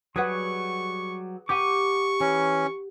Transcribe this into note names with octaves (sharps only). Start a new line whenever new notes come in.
F#3 G3 G#4 B4 F#5 C#6
G4 F#5 C#6 D6 D#7
E3 C#4